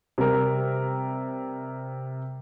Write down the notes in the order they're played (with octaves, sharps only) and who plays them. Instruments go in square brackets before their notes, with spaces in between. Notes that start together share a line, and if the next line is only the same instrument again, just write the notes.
[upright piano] C3 G3 A#4